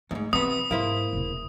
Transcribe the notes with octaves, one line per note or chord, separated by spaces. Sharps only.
E2 G#2 A3
C3 E3 B3 D#6
G#2 A#3 E4 C5
E1 C#3